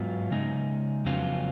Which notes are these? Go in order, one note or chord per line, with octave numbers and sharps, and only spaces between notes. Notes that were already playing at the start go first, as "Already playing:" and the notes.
Already playing: G#2 F#3 B3 F4
C#3 G#3 D#4
F2 C#3 F#3 B3 F4